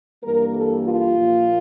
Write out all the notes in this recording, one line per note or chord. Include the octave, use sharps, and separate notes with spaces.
G2 E3 G3 A#3 A#4
A4
F4
A#2 F3 A#3